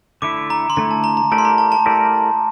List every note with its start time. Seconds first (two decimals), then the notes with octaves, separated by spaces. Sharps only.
0.22 D3 A3 E4 D6
0.50 A#5
0.70 C6
0.76 D3 A3 E4 A#5
0.91 A5
1.04 A#5
1.17 A#5
1.31 A3 E4 G4 A#4 D5 A5
1.38 C6
1.45 A#5
1.58 A5
1.72 A5
1.86 A3 E4 G4 A#4 D5